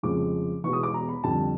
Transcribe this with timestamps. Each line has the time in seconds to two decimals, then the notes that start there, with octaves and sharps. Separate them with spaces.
0.03 F1 F2 C#3 F3 G#3 D6
0.64 E1 E2 B2 G#3 C#6
0.73 D#6
0.83 D6
0.94 A#5
1.09 B5
1.24 F2 D3 G3 A5